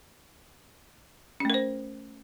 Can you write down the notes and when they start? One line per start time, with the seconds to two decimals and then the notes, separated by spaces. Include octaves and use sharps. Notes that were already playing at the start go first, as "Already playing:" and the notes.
1.40 C#4
1.45 A3
1.50 A#4
1.54 C5